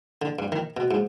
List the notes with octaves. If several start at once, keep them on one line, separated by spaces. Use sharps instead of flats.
D3
G2
D#3
B2
G#2